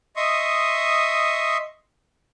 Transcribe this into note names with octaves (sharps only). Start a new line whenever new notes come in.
D#5 E5 C6 C#6 D#6